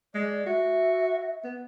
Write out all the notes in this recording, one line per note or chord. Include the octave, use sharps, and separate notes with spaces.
G#3 D5
F#4 E5
B3